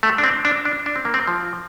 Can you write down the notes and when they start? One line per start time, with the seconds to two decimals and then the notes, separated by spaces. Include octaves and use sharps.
0.03 A3
0.18 D4
0.23 C4
0.45 D4
0.65 D4
0.86 D4
0.96 C4
1.05 A#3
1.14 C4
1.27 F3